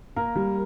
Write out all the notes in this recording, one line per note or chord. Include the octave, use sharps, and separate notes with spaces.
A#3 A#4
G3